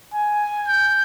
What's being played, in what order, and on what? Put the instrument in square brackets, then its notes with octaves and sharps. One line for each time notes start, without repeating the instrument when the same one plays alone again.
[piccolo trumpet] G#5
G6